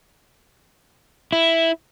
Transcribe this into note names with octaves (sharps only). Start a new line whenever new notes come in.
E4